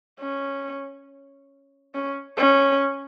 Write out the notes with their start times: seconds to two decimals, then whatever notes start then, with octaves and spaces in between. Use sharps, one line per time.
0.20 C#4
1.95 C#4
2.37 C#4